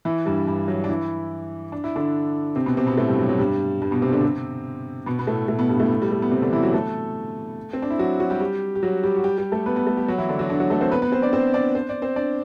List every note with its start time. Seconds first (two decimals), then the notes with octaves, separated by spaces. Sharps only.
0.05 E3 E4
0.26 G2 G3
0.47 G2 G3
0.68 F#3
0.84 D4
0.89 E3 E4
1.72 D4
1.84 E4
1.96 D3 D4
2.56 C3 C4
2.66 B2 B3
2.77 C3 C4
2.87 B2 B3
2.97 A2 A3
3.08 G2 G3
3.19 F#3
3.29 F#3
3.39 G2 G3
3.82 G2 G3
3.91 B2 B3
4.02 C3 C4
4.12 D3 D4
4.23 C3 C4
5.06 B2 B3
5.19 B3
5.27 A2 A3
5.48 A2 A3
5.59 B2 B3
5.69 G2 G3
5.80 A2 A3
6.02 G3
6.12 A3
6.22 B3
6.31 C3 C4
6.42 D3 D4
6.53 E3 E4
6.63 F#3 F#4
6.73 A3 A4
7.73 C4
7.82 D4
7.90 E4
7.99 F#3 F#4
8.20 F#3 F#4
8.30 G3 G4
8.40 G3 G4
8.75 G4
8.83 F#3 F#4
9.04 G3 G4
9.16 F#4
9.24 G3 G4
9.38 G3 G4
9.52 A3 A4
9.66 B3 B4
9.76 B3 B4
9.87 A3 A4
9.97 G3 G4
10.08 F#3 F#4
10.18 E3 E4
10.29 D3 D4
10.39 F#3 F#4
10.50 D3 D4
10.60 F#3 F#4
10.70 A3 A4
10.81 C4 C5
10.91 B3 B4
11.02 B3 B4
11.12 C4 C5
11.22 D4 D5
11.33 C4 C5
11.54 D4 D5
11.75 C5
11.89 D5
12.02 C4 C5
12.16 D4 D5